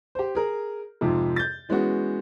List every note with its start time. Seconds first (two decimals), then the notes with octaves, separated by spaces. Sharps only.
0.15 G4 C5
0.35 G#4 A#4
1.01 F2 G#2 C3 F3
1.36 G6 A6
1.69 E3 G#3 B3 C#4 F#4